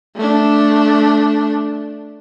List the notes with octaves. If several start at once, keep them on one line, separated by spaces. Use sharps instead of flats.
A3 D4